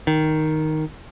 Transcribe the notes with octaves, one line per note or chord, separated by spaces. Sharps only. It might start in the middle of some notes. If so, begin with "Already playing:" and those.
D#3